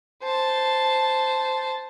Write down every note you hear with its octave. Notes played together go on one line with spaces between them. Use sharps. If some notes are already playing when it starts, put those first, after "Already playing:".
C5 A5